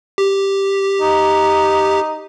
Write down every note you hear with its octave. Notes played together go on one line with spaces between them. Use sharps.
G4
D#4